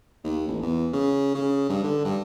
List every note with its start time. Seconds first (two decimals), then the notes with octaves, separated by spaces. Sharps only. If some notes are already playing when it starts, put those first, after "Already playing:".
0.24 D#2
0.48 A1
0.62 E2
0.93 C#3
1.35 C#3
1.69 G2
1.84 D3
2.05 G2